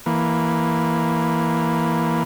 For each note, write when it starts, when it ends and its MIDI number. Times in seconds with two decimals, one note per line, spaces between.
0.06 2.23 52
0.06 2.23 58